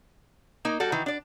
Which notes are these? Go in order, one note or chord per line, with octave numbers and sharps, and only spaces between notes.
A#3 D#4
G3 F#4 A4
D#3 E3
D4 D5